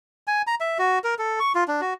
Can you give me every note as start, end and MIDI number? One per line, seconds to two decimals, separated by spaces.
0.27 0.42 80
0.47 0.55 82
0.60 0.78 76
0.79 0.99 66
1.04 1.15 70
1.19 1.39 69
1.40 1.52 85
1.55 1.64 65
1.68 1.81 62
1.81 1.94 66